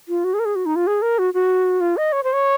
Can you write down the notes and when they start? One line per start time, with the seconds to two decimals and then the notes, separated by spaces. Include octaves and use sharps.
0.08 F4
0.24 F#4
0.34 G#4
0.39 A#4
0.45 G#4
0.56 F#4
0.66 D#4
0.76 F4
0.87 G#4
1.02 A#4
1.18 F#4
1.34 F#4
1.81 F4
1.97 D#5
2.12 C#5
2.24 C5
2.33 C#5